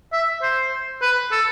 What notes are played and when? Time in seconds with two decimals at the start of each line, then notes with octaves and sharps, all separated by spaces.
0.13 E5
0.42 C5
1.02 B4
1.32 A4